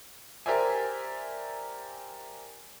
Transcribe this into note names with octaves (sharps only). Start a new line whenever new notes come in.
G4 A#4 C5 D5 E5 G#5